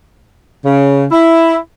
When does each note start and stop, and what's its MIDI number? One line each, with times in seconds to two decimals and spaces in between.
0.65 1.05 49
1.11 1.55 64